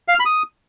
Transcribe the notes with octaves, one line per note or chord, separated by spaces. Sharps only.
F5
F6
B5
D#6